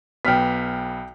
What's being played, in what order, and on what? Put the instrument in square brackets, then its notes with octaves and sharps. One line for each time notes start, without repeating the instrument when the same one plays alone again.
[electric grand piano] B1 B3 [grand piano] G5 F6 B6